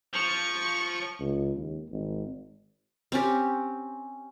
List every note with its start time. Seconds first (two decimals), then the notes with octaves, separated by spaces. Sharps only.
0.13 F3 C#6
1.19 C#2
1.57 D#2
1.91 G#1
3.12 C4 C#4 G4